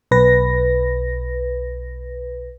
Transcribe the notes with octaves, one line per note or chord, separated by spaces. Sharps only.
B1 B4 A#6